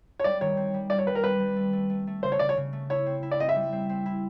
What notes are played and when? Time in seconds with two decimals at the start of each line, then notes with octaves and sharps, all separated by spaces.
0.19 C#5
0.24 G3 D5
0.41 D#3 C#5
0.57 C4
0.74 G3
0.90 G3 D5
0.99 C#5
1.07 G3 B4
1.15 A#4
1.24 C4 B4
1.40 G3
1.56 A3
1.73 A3
1.90 A3
2.07 A3
2.23 C#3 C5
2.32 C#5
2.39 C#3 D5
2.49 C#5
2.57 C#3
2.73 A3
2.90 E4 C#5
3.06 C4
3.23 E4
3.31 D5
3.39 C4 D#5
3.49 E5
3.56 G3
3.73 C4
3.89 C4
4.06 E4